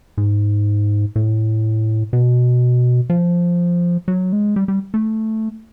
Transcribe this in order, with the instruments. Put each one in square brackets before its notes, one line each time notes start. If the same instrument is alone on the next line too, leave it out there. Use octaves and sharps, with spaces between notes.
[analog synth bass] G#2
A2
B2
F3
F#3
G#3
G3
G3
A3